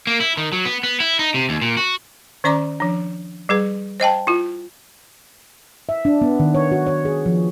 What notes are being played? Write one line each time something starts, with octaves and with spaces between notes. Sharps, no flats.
A#3
E4
D#3
F#3
B3
B3
E4
D#4
C3
D#2
A#2
F#4
D#3 C#4 D5 A#5 D6
F3 D4
G3 G#4 B4
C5 D#5 G5 A5
E4 F4
E5
D4
B3
D#3
C#5
F#4
C#5
G#4
F3